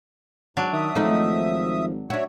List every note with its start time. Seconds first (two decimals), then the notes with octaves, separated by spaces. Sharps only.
0.57 G#2 F#3 D4
0.73 D#3 E5 D#6
0.95 G#1 F3 A3 D#4
2.10 D4 F#4 C#5 E5